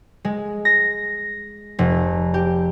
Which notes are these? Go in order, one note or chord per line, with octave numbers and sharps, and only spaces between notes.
G#3
A#6
F1
G4